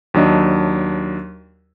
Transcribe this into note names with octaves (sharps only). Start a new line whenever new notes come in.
D#2 F#3 D4 D#5